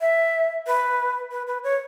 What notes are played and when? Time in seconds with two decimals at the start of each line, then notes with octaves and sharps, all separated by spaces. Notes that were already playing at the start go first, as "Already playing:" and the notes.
0.01 E5
0.67 B4
1.31 B4
1.47 B4
1.64 C#5